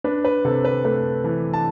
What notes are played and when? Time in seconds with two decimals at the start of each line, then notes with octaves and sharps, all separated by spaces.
0.04 D4 B4
0.25 B4
0.45 C3 A4
0.65 B4
0.85 A3 B4
1.24 E3
1.53 A5